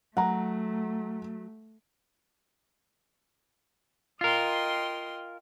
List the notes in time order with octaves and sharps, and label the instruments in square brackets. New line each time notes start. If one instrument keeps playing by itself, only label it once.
[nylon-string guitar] F#3 [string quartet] A3 [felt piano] F#5 A#5
[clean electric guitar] F4 A#4 [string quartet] D#5 G5 C6